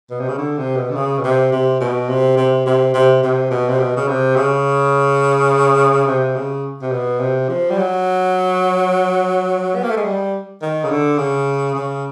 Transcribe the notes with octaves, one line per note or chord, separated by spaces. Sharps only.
B2
C3
C#3
D3
C3
B2
D3
C#3
B2
C3
C3
B2
C3
C3
C3
C3
C3
B2
C3
B2
C#3
C3
C#3
C3
C#3
C3
B2
C3
F3
G3
F#3
B3
A#3
A3
G#3
G3
D#3
C#3
D3
C#3
C#3